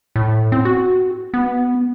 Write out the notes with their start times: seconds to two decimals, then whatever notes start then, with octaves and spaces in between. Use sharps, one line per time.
0.16 A2
0.52 C4
0.65 F#4
1.34 B3